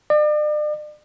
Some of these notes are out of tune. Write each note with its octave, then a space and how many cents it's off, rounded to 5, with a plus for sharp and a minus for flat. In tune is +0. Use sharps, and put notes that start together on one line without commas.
D5 +40